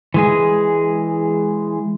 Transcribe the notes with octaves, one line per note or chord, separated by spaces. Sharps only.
E3 G#3 G#4